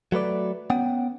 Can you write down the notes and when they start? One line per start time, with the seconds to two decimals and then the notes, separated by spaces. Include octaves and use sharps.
0.12 F#3 A3 B4 D5
0.70 B3 C#4 F#5 G5